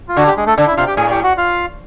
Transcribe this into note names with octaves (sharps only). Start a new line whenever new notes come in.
F4
D3 F#4
G4
G#3 G#4
A3 A4
D3
E4 E5
C3 F4 F5
G4 G5
A2 G#4 G#5
G4 G5
F#4 F#5
F4 F5